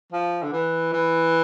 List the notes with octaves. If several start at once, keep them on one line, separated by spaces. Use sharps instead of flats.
F3
D3
E3
E3